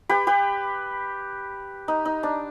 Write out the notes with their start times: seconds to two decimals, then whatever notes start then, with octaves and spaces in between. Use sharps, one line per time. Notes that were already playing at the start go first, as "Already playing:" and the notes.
0.09 G4 B4
0.27 G4 B4
1.88 D#4
2.05 D#4
2.23 D4